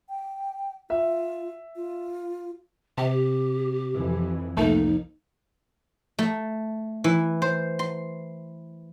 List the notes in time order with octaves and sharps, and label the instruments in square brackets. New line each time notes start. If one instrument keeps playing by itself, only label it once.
[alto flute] G5
[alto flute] F4 [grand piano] E5
[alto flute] F4
[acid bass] C3 [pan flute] G4
[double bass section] F2 E3
[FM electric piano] C2 A#3 [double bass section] F2 [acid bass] A3 [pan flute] D#4
[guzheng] A3
E3
C5
C6